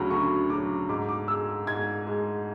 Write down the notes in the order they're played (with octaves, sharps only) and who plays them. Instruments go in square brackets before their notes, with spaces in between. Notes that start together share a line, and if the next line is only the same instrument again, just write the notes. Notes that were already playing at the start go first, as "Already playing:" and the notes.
Already playing: [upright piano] D2 C#3 F#3 B5
D2 C#6
C#3 F#3 D6
G#2 D6
D6
G#3 E6
G#2 G#6
G#3